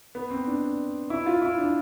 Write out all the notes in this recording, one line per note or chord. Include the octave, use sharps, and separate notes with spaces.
B3
C4
D4
E4
F4
E4
D4